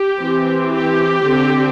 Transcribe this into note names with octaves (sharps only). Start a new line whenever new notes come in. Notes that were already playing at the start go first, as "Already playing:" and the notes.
Already playing: G4
E3 C4
G4
D3 C4